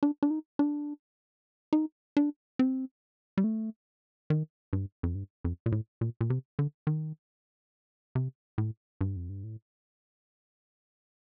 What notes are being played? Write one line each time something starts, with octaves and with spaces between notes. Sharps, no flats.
D4
D4
D#4
D4
D#4
D4
C4
G3
A3
D#3
G2
F2
G2
F2
A#2
A2
A#2
A#2
C3
D3
D#3
C3
A2
G2
F2
G2
A2